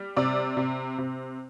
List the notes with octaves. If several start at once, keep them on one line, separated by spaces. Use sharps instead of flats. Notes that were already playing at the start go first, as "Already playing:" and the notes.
Already playing: G3
C3 D5
C3
C3